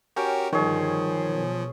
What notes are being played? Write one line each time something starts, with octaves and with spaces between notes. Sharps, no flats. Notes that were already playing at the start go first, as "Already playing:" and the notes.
C#4 F#4 G4 A#4 G5
G1 D#3 F3 G3 G#4 C#5
B1 B2